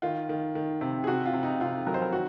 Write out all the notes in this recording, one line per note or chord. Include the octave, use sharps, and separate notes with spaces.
D#3 F4
D#3
D#3
C3
G#4
C3 F#4
F4
C3
D#4
C3 F4
F#3 A#4
C5
A#4
D#3 F#4